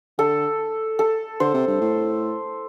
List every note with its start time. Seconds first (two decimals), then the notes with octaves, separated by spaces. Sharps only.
0.18 D3 A4
0.99 A4
1.40 D3 C5
1.54 C3
1.67 G2
1.81 A2